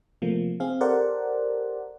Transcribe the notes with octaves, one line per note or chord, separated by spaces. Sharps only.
C3 F3 A3 A#3
C4 G#4 F5
G4 A4 A#4 C5 D5 F#5